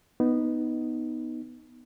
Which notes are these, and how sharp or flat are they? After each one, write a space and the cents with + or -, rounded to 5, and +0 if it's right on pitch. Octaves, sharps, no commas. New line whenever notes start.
B3 +0 D#4 +0